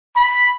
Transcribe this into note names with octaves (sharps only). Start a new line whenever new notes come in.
B5